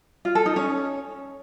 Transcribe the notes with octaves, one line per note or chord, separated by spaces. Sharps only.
F4
A4
D#4
C#4